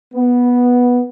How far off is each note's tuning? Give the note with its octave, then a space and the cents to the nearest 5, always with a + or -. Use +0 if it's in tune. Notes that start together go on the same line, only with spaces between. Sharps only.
B3 -10